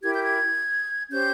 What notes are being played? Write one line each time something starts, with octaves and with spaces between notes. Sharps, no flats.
E4 G4 A#4 G#6
G6
G#6
C#4 G4 C5 G6